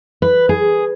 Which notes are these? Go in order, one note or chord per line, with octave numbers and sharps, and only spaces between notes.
B4
G#4